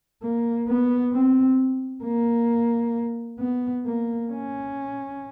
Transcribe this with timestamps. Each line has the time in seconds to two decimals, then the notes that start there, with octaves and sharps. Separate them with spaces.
0.23 A#3
0.68 B3
1.12 C4
2.04 A#3
3.39 B3
3.85 A#3
4.30 C#4